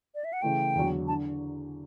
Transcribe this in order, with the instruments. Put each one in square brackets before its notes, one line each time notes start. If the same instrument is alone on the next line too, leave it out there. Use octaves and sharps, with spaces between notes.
[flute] D5
E5
F#5
[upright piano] C#3 E3 A3 [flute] G5
[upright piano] E2 D3 F#3
[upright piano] D3 [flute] A5